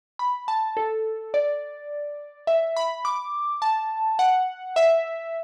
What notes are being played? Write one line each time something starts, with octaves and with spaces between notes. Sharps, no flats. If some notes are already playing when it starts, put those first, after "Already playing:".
B5
A5
A4
D5
E5
B5
D6
A5
F#5
E5